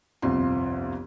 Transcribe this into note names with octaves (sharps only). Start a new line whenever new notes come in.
G1 C2 F2 F4 C6